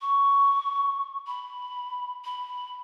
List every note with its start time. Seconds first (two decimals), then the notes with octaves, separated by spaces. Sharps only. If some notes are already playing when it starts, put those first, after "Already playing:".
0.01 C#6
1.27 B5
2.24 B5